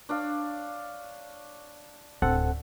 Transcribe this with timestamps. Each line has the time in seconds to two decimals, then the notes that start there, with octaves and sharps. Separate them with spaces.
0.09 D4 C#5 F5
2.22 D1 C4 A4 F#5